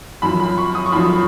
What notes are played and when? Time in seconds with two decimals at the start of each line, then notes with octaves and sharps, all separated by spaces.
0.22 F#2 F3 B5
0.40 B5
0.58 C#6
0.75 D#6
0.86 C#6
0.92 F#2 F3 B5